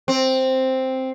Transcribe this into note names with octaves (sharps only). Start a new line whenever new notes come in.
C4